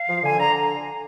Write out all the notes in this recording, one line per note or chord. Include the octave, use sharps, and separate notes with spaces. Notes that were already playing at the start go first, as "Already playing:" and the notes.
Already playing: F5
F3
D3 G#5
D3 A#5